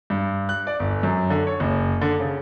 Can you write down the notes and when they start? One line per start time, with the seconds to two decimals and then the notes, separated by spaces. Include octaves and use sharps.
0.10 G2
0.49 F#6
0.67 D5
0.80 G1
1.03 F#2
1.30 D3
1.47 C#5
1.60 F#1
2.01 D3
2.20 C#3